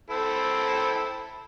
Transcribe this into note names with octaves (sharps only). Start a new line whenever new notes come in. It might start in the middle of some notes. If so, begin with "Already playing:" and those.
C4 E4 A4